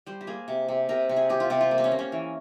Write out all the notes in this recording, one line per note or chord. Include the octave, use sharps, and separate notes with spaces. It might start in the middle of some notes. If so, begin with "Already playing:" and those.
G3 C5
G4
A#3 G#4
C3
C3
C3 A#4
C3
G#4
C3 G4
F4
C3 G4
F4
A#3
C4
C#4
A#3
C#4
E3